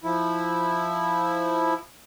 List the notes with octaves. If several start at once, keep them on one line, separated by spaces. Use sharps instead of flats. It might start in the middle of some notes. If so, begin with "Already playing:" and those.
F3 E4